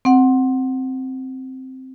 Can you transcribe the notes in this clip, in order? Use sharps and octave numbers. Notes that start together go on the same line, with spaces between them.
C4 F#5